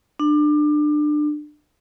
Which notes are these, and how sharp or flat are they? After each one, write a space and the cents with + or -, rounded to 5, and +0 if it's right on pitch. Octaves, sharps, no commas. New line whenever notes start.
D4 +25